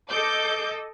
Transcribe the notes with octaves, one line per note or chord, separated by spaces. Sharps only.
A4 D#5 D6 G6